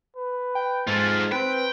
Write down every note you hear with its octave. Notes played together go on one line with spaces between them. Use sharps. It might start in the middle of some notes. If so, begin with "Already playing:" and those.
B4
G5
G#2 F4 A4
C4 B4 G5